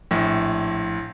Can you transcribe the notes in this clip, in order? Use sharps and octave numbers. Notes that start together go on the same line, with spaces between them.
A#1 A2